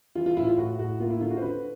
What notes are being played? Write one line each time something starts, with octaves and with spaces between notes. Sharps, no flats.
E3 F4
F4
A2 E4
F4
A2 F#4
A2 F#4
A#3 F4
E4
D3 F4
F#4
C5
D3 B4